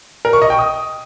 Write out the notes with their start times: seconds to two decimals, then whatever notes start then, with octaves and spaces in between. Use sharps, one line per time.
0.25 A#4
0.33 C#6
0.42 D#5
0.50 G5
0.59 D#6